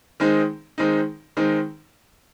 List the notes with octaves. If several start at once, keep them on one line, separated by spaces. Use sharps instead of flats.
D#3 G#3 C4 D#4
D#3 G#3 C4 D#4
D#3 G#3 C4 D#4